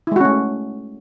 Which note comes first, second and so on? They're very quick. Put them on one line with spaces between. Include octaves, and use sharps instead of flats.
E4 G#3 F#4 C#4 A3